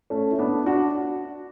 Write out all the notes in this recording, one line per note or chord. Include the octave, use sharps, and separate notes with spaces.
A3 C#4
E4
B3 D4
D4 F#4